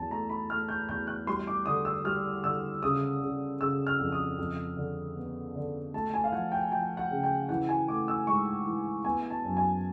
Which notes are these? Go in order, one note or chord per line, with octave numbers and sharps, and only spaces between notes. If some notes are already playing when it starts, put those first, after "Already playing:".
Already playing: E2 A5
A3 A#5
B5
A3 F6
G6
E2 G6
F#6
G3 C6
D6
D3 D#6
E6
G3 F6
D3 E6
C#3 D#6
C#3
C#3 E6
F6
F2
D#6
F2
D3
B3
D3
A3 A5
G#5
F5
F3 F#5
G5
F3 G5
F#5
C#3
G5
E3 F#5
G#5
A3 D6
E6
G#2 C#6
E3
B3 G#5
A5
F#2
G#5